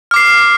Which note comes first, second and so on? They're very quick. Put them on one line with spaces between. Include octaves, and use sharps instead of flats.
F6 D6 C7